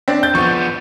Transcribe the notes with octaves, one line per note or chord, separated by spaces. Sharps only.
C4 D4
G6 A6
F3 B3 C#6